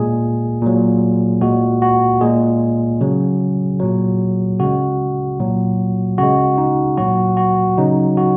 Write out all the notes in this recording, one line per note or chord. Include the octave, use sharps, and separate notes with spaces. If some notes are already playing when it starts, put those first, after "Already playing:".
Already playing: A#2 G#3 G#4
A#2 F#3
A#2 G#3 F#4
F#4
A#2 G#3 G#4
C#3 F#3
A#2 F#3
C#3 G#3 F#4
A#2 F#3
C#3 G#3 F#4
D#4
A#2 F#3 F#4
F#4
C#3 F#3 D#4
F#4